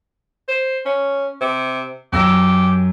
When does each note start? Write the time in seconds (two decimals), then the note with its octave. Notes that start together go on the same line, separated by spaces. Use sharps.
0.48 C5
0.85 C#4
1.41 C3
2.12 F#2 G4 E6 A#6